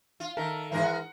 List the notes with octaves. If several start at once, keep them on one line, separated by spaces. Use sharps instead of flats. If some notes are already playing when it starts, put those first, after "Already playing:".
F4
D#3 A4 A#4 E5
G#2 D#3 E3 G#3 A#4
F#5